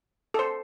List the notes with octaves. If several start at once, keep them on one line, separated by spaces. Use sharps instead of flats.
A4
C5